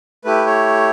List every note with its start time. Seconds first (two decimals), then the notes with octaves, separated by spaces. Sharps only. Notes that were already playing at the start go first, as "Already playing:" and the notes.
0.24 A3 E4 G4 B4
0.47 C#5